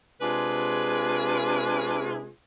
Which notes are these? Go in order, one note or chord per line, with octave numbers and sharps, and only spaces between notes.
C3 G#3 D4 F4 G#4 B4